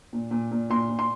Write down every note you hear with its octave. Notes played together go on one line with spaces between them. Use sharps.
A#2
A#2
A#2
A#2 C6
A#2
C6